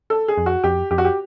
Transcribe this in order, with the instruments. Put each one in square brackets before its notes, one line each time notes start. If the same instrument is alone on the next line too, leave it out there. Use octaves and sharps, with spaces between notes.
[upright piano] A4
G#4
[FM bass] F2
[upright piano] F#4
[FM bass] F2 [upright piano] G4
[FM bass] F2 [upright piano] G4
[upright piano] F#4
G4